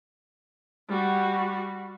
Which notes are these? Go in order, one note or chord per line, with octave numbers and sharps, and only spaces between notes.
G3 F#4